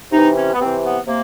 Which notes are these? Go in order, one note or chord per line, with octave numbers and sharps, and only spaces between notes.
C3 E3 D#4
C#4
B3
C3 E3 C4
B3
C3 A#3